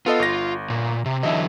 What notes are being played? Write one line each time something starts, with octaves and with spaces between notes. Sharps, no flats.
B3 F4 A4 D#5
G1 A#6
A#2
C3
D3 E3 F#3 D#5 E5